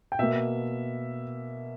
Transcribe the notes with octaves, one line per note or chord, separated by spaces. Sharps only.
G5
B2 A#3 E5